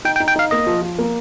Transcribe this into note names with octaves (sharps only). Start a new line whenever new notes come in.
D#4 G5
G5
D#4
G5
D#4 F5
A#3 D#5
F3
F3
A#3